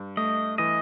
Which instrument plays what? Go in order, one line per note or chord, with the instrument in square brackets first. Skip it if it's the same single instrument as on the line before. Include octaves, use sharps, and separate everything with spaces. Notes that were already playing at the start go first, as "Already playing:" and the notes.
Already playing: [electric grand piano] G2
[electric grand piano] A3 [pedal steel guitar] D#5
[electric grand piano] E3 [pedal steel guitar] D#5